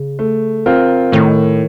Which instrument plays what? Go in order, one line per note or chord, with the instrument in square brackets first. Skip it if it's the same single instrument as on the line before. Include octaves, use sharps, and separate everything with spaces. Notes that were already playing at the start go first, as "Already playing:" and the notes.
Already playing: [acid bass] C#3
[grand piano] A3
C4 F4 A#4
[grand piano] A2 [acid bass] D#3